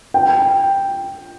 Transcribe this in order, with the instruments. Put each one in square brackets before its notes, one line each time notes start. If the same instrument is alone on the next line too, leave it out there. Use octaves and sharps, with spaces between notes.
[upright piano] G5